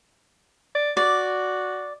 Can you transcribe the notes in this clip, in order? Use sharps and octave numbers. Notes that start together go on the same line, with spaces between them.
D5
F#4 D5